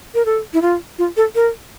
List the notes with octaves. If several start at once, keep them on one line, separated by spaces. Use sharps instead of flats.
A#4
A4
E4
F4
F4
A4
A#4